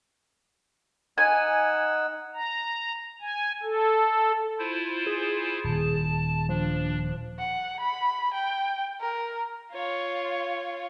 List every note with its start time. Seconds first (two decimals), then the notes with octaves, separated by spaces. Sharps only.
1.18 D#4 F#5 G#5 E6
2.34 A#5
3.21 G#5
3.63 A4
4.59 E4 F4 C5
5.06 G#4
5.64 D#1 A5
6.49 F3 D4
7.39 F#5
7.80 B5
8.33 G5
9.01 A#4
9.72 F4 C#5